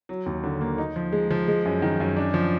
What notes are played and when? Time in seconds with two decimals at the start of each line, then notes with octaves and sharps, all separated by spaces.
0.09 F#3
0.26 D#2
0.44 D3
0.61 A#3
0.78 D#4
0.96 F3
1.12 G#3
1.30 F3
1.48 G#3
1.65 F#2
1.82 D#3
2.00 F#2
2.17 D4
2.34 F3